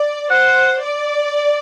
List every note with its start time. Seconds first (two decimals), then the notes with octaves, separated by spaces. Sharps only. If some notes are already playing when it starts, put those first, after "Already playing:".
Already playing: D5
0.31 C5 F#5
0.81 D5